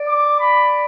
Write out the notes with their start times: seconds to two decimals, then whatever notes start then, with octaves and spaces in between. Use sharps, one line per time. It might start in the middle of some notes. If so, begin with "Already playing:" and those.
Already playing: D5
0.08 D6
0.40 B5